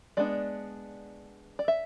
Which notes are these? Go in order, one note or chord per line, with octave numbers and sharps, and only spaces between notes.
G#3 B3 D4 D5
D5
E5